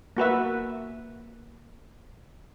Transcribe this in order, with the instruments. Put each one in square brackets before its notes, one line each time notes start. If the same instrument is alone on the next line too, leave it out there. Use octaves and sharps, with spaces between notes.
[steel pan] A#3 F#4 B4 E5